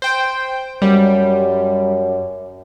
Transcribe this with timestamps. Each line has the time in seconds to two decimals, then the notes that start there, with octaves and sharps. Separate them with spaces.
0.02 C5 G5
0.82 F#2 G3